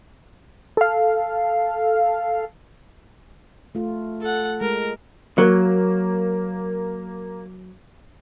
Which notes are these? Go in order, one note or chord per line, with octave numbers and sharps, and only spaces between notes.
A4 F5
A3 F4
A4 F#5
G#3 A#4
F#3 A#3